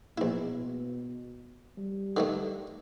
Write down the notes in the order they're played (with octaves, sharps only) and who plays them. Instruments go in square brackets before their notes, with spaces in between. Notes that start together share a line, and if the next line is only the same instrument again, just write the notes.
[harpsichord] A#1 E4 [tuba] B2
[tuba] G3
[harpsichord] D3 D#3 A3